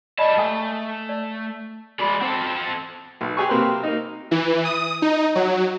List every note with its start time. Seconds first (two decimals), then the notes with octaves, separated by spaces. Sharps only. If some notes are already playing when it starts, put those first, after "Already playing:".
0.19 G3 D5 D#5 A5 B5
0.38 A3 G#4 G#5 D#6
1.09 D5
2.00 G#3 F#4 D5 B5
2.21 C4 A4 C5 F#5
3.21 B1
3.37 G4 G#4 G#5 C#6
3.48 C3 A#3 C4 A#4 B4 C6
3.83 A#3 D#4
4.31 E3
4.65 D#6
5.02 D#4
5.35 F#3